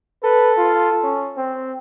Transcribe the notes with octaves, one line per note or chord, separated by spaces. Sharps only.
A4 B4
F4
C#4
C4